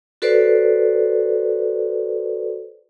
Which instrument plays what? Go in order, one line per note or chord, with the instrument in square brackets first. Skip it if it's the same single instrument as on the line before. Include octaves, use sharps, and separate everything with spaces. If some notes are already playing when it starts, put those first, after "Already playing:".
[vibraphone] F#4 A4 B4 C5 D5